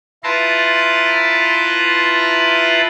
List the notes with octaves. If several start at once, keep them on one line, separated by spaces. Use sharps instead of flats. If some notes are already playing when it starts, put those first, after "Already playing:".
E4 F4 B4 A5 A#5 C6